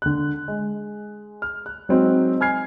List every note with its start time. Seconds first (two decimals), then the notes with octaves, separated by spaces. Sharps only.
0.02 D3 F#6
0.48 G#3
1.42 F6
1.66 F#6
1.89 F#3 G#3 C4 D#4
2.41 G#5 F6 G#6 C7